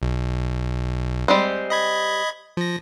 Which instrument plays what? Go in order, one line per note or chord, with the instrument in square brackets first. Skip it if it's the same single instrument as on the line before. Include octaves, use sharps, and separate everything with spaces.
[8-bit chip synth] B1
[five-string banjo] G3 G#3 C4
[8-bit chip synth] D#5 B5 G#6
F3 A#6